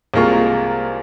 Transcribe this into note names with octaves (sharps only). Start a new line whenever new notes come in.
C2 G#3 A#3 F4 C#6